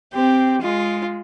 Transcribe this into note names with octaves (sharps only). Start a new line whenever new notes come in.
C4 G4
G#3 F4